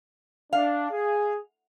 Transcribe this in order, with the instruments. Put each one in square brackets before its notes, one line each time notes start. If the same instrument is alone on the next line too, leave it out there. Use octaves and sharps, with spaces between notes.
[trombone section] D4 [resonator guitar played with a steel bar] F5
[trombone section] G#4